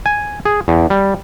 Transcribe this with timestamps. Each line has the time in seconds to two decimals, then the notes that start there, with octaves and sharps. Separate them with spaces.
0.06 G#5
0.45 G#4
0.68 E2
0.90 G3